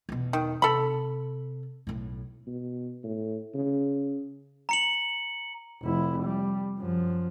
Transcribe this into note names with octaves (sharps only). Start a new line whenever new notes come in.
E2 B2
D#3
C3 A4 B5
B1 A2
B2
A2
C#3
A#5 C#7 F#7
F1 E4
G3
F#2 F3